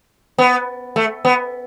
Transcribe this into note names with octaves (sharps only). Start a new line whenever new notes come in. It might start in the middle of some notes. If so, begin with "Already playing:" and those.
B3
A3
B3